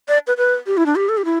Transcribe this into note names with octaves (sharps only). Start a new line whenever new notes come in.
D5
B4
B4
G4
E4
D4
G4
A4
G4
E4